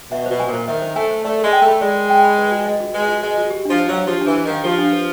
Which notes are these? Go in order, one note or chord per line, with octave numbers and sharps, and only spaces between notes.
B2 E5
B2 C5
G#5
A#2 C5
D#3 E5
C5
A3 G#5
C5
A3 D5
A#4
G#3
G5
A3
B5
G#3 D5
A#4
G5
B5
B4
F#4
D#5
F#4
G#3 B4
F#4
G#3 D#5
F#4
G4
F3 D4
C5
F#3 F5
F3 G4
D4
E3
C5
D#3
F5
F3 G4
D4
B4